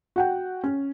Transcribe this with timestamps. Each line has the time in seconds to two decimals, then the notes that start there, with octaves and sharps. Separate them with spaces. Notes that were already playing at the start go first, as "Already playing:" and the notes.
0.16 F#4 F#5 G5
0.64 C#4